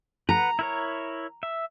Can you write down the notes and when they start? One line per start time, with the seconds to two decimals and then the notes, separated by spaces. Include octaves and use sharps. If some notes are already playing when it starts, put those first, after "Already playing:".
0.29 B4 F#5 A#5
0.59 E4 A#4 C#5
1.43 E5